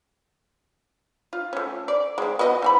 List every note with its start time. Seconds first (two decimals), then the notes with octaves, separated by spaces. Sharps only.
1.33 F4
1.53 A3 C#4
1.88 D5
2.18 G#3 C4
2.39 B3 F#4 D#5
2.62 E3 G#5 B5